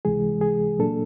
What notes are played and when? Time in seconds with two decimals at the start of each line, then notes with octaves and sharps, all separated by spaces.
0.05 C#2 C3 E3 G#3 G#4
0.41 G#4
0.79 A#2 F#3 A#3 D4 A4